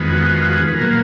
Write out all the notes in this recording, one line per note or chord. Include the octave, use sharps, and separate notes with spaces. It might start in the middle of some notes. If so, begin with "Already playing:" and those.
Already playing: F2 D#3 G#3 B3
F#4
F4
F#4
G#4
B4
A#4
A#2 F#3 A#3 G#4